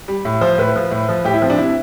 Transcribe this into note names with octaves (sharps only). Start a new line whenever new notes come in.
G3
A2
F3 C5
A2 B4
F3
A2
F3
A2 G4
E4
F3 C4
D4
C3 E4